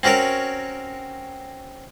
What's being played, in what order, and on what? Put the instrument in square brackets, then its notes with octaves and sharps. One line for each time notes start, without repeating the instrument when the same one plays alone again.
[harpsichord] C4 C#4 F#4 A#4 C#5